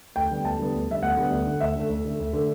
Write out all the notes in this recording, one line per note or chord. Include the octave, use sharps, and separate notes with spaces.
D2 G5
D3 G3 B3
D2 A5
D3 G3 B3
D2
D3 G3 B3 E5
D2 F#5
D3 G3 B3
D2
D3 A3
D2 E5
D3 A3
D2
D3 A3
D2
D3 A3